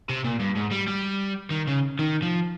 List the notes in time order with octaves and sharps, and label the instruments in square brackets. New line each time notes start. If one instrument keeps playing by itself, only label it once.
[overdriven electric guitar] C3
A#2
G2
G#2
G3
G3
D#3
C#3
D#3
F3